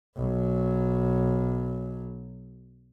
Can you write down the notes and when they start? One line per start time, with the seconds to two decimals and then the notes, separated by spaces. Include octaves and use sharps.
0.18 B1 F#3